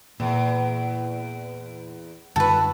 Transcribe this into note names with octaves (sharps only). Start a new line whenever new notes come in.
E2 A#2
F#2 D3 G3 F#4 A4 B4